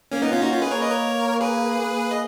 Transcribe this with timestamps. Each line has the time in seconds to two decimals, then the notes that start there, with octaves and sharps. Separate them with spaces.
0.12 A#3 C#4
0.22 A#3 B3 D#4
0.32 C#4 F4
0.41 D#4 F#4
0.52 C#4 F4
0.62 A#3 G#4 B4
0.71 A#4 C#5
0.82 B4 D#5
0.91 A#4 C#5
1.41 G#4 B4
1.80 A#3
2.11 D#5